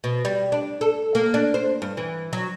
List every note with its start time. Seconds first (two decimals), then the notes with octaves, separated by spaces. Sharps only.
0.04 B2
0.25 G3
0.52 D4
0.81 A4
1.15 A#3
1.34 D4
1.54 C5
1.82 G2
1.97 E3
2.33 F#3